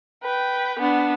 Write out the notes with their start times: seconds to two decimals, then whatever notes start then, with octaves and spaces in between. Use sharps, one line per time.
0.24 B4 G5
0.79 B3 D4